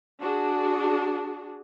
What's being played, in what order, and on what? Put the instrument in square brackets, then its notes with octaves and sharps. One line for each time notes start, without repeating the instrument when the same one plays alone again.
[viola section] D4 F#4 G#4